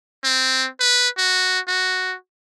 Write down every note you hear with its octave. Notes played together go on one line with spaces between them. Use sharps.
C4
B4
F#4
F#4